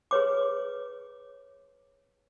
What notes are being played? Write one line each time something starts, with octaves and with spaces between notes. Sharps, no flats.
G#4 B4 C#5 D6